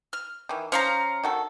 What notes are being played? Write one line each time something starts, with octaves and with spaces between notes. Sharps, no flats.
F6
D#3 E3
F3 C#4 C5 F5 A#5
D#3 F#4 A4